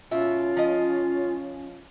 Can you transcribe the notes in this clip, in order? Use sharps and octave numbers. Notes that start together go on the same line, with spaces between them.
B2 C#4 F4 E5
F3 D#5